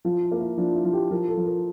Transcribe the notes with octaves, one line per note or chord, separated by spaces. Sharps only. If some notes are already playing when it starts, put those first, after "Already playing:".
F3 F4
E4
A#3
E4
F3 D4
E4
F3
G4
F3 A#4
A4
F3
A#4